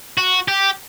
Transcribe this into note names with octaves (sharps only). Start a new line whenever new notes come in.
F#4
G4